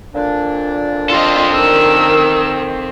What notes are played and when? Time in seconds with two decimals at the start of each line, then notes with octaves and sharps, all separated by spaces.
0.14 F2 A#2 D4
1.10 C4 F4 A4 D#5
1.55 D#3 A#4 E6